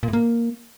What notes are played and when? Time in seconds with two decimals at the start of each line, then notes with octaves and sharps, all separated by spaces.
0.03 A#2
0.08 A2
0.13 A#3